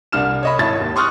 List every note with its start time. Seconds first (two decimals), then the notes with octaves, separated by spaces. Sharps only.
0.12 C2 D4 F6 E7
0.43 C#5 D#5 B5
0.58 G#1 E4 C#5 A5 A6
0.80 D#2
0.96 C6 C#6 D#6 F6 F#6